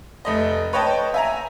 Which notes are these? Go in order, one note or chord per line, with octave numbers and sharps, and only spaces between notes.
F1 A3 D#5
B4 C#5 D#5 G5 A5
E5 G#5 A#5